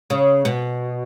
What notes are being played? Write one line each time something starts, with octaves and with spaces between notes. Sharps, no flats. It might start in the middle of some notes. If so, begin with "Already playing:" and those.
C#3
B2